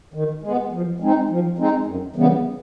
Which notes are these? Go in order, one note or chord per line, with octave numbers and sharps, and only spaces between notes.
D#3
G#3 B3
F3
G#3 C4 D#4
F3
G#3 C4 D#4
F#2
C#3 E3 G3 B3